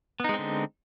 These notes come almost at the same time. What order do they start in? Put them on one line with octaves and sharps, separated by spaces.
B3 D#4 G#3 C4 D3